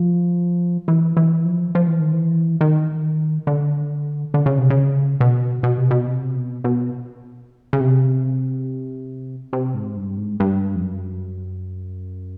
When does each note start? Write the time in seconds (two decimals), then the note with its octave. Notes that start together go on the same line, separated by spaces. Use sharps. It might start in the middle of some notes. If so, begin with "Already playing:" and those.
Already playing: F3
0.88 E3
1.17 E3
1.45 F3
1.75 F3
1.87 E3
2.00 D#3
2.13 E3
2.61 D#3
3.47 D3
4.34 D3
4.46 C#3
4.58 C3
4.70 C#3
5.21 B2
5.63 B2
5.78 C3
5.91 B2
6.07 C3
6.36 B2
6.64 B2
7.73 C#3
7.80 C3
9.53 C3
9.74 G#2
9.97 G2
10.17 G#2
10.40 G2
10.75 F2
10.82 F#2